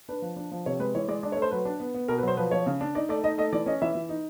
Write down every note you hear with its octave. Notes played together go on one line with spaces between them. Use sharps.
D4 B4
F3
D4
F3
C3 C#5
G#3 B4
E3 C#5
G#3 D5
D4 D5
C#5
A3
C5
F#3 B4
D4
B3
B3
B2 A#4
B4
F#3 C5
F3 B4
F3 C#5
C#3
D4
D#4 D5
A3 D5
D#4 D#5
A3 D#5
E3 D5
C#4 D#5
E3 E5
E3
D#4